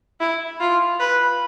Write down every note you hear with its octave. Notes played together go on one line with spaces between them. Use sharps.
E4
F4
B4